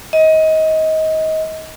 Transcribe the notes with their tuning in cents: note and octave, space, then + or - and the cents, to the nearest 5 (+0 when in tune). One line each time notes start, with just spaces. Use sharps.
D#5 +25